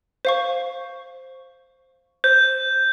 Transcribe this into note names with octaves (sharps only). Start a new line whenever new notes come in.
C5 F5 C#6
C5 G6